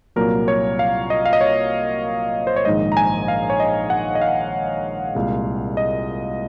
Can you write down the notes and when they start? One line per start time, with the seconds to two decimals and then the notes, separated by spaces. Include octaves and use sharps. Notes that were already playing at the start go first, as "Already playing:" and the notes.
0.16 C2 A#2 F#3 A#3 A#4
0.48 C#5
0.79 F5
1.10 D#5
1.26 F5
1.33 D#5
1.41 C#5
2.47 C5
2.56 C#5
2.65 A#1 G#2 D#3 G#3 D#5
2.92 A#5
2.97 G#5
3.28 F5
3.50 C#5
3.60 D#5
3.90 F#5
4.15 D#5
4.21 F5
5.15 C2 A#2 G#3
5.77 D#5